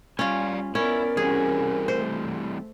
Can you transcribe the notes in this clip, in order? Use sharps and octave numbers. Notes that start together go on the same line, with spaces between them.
G3 C#4 F4 D5 F5 G#5
B3 C#4 E4 A#4 D5
E3 G3 C4 C#4 F#4 G#4
A3 C5